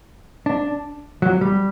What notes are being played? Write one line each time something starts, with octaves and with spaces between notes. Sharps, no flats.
D4
F#3
G3